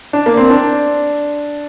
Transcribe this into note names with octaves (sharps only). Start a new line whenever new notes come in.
D4
A#3
C4
D4